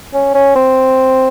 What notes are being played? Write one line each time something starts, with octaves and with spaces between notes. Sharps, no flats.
C#4
C#4
C4